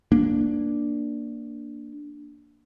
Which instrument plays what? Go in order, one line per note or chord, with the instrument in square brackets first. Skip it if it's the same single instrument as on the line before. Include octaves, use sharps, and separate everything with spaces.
[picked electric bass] A#3 D4